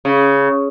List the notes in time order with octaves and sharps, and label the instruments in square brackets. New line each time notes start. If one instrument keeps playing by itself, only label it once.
[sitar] C#3